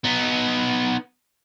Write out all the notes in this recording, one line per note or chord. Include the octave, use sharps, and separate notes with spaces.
B3 D#4